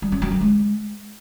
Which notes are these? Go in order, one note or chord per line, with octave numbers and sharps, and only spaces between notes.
G3
C#4
F#3
D4
G#3